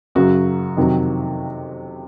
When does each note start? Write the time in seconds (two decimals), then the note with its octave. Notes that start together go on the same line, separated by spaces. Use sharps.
0.15 F#2 C#3 F#3 F#4
0.77 F2 C3 D#3 F#3